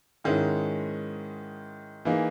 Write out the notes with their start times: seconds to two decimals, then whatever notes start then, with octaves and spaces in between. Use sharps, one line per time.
0.24 G#2 D#3 G#3 C#4 E4
2.05 E3 A#3 D#4 G#4